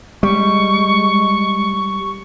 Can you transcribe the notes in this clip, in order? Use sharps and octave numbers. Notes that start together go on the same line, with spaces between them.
G3 G#3 C#6